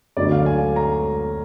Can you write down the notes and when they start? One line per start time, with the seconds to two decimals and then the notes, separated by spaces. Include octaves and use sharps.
0.17 D2 D3 F#3 D5
0.32 F5
0.46 G#5
0.76 A#5